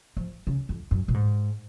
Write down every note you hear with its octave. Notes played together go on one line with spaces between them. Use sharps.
F3
C#3
F2
F#2
A#2
G#2